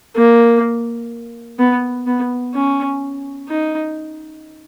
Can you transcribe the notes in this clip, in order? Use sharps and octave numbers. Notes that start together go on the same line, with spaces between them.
A#3
B3
B3
C#4
D#4